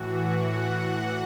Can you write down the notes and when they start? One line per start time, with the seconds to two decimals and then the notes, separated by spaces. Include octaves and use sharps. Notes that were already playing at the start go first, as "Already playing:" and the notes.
Already playing: A2 E3 F#4
0.19 F#5